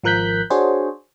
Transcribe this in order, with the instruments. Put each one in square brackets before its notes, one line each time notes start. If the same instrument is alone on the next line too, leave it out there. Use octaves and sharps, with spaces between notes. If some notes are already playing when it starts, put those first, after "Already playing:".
[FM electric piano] G#1 F3 A#4 F#6 G6 B6
D4 F#4 G#4 C5 C#5